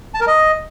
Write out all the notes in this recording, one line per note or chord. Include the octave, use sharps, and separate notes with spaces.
A5
A#4
D#5